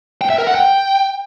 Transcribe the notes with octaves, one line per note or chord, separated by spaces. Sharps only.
G5
E5
A#4
F#5
G5